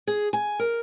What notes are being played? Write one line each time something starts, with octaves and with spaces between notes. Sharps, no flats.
G#4
G#5
A#4